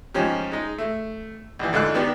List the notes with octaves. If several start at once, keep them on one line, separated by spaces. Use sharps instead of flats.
G#2 F3 C#4 G4
G#3 D#4
A3
A#1 E3
G#2 D3 F4 E6 F#6
D#3 B3 D4 G4